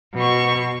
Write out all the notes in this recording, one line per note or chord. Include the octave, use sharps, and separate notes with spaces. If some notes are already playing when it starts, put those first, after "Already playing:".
B2 C#6